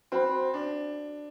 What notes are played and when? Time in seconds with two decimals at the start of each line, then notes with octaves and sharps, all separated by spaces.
0.12 C4 F#4 C5 F#5 B5
0.54 D4